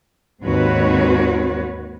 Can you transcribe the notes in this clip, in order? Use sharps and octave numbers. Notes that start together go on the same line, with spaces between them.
D#2 G#2 C4 F#4 B4 C#5